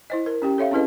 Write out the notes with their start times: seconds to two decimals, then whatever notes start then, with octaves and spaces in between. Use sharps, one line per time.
0.10 E4 C5 D#5
0.26 A#4
0.42 C#4 G4 G5
0.58 A4 C#5 E5 F5
0.71 C4 C#4 E4 G#4 B4 D#5